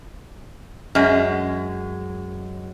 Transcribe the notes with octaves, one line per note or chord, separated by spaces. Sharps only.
F#2 G#3